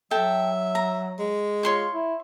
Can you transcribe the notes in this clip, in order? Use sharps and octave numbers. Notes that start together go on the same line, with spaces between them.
F#3 A4 E5 G5
A#5
G#3
F4 C#5 C6 C#6
E4